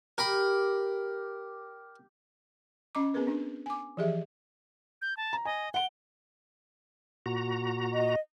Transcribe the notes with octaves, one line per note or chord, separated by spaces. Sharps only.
G4 A#4 B5
C#4 D#5 A#5 D6
B3 C4 G#4 A#4 B4
C4 D4
G#5 D6
E3 F3 G4 G#4 E5
G6
A5
A#5
D#5 G#5
F#5 D7 G7
A#2 F#4 A#5
D#5